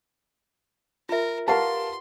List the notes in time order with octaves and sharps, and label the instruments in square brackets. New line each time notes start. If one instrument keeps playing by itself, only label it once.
[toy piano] F4 E5 [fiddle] A#4
[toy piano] G4 B4 F#5 [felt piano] A#4 F5 A5 [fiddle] C6